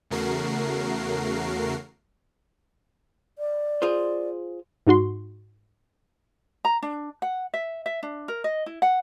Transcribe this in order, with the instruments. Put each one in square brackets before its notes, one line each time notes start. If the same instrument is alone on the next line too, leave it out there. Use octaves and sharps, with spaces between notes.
[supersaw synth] E2 C#3 A3 F#4 A#4 C7
[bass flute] D5
[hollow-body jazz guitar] F4 G#4 C5
[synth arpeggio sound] G#2 D#4 F#4 C6
[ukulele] A#5
D4
F#5
E5
E5
D4
A#4
D#5
E4
F#5